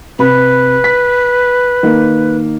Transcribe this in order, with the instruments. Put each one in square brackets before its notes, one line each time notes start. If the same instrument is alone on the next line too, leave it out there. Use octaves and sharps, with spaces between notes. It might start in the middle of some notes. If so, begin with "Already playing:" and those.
[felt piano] C3 B5 [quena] B4
[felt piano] B6
D#3 A#3